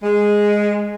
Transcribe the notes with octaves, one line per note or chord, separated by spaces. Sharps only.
G#3